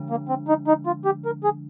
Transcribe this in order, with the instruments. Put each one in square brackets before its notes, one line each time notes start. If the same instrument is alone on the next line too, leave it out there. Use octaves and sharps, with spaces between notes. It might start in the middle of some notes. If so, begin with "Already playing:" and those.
Already playing: [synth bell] D3 F3 G#3 D4
[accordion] A#3
C4
D#4
D#4
F4
G4
A#4
G#4